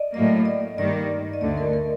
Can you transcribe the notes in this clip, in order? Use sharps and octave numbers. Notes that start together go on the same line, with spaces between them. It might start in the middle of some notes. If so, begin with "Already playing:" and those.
Already playing: D5 D#5
A2 F#3 A#3 D#5
D5
G2 D#3 G3 A#3 D5
D#5
D2 D3 A3 D5
A#4
A#4